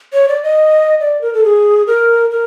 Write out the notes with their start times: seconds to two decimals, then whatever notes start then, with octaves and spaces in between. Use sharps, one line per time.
0.13 C#5
0.29 D5
0.43 D#5
1.00 D5
1.21 A#4
1.34 A4
1.44 G#4
1.87 A#4
2.31 A#4